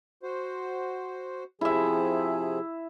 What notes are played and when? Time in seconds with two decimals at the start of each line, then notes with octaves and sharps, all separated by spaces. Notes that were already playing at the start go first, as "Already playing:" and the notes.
0.23 F#4 C5
1.61 C3 F3 E4 G#4 E5